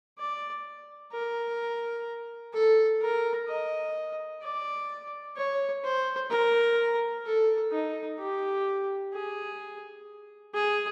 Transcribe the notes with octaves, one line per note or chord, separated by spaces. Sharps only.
D5
A#4
A4
A#4
D#5
D5
C#5
C5
A#4
A4
D#4
G4
G#4
G#4